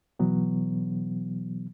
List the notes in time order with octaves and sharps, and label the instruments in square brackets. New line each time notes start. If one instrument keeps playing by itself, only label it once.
[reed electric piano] B2 E3 F#3 B3